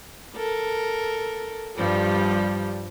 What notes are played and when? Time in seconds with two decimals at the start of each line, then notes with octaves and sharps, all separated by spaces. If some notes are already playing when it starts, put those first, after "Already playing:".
0.36 A4 A#4
1.76 G2 F3 G3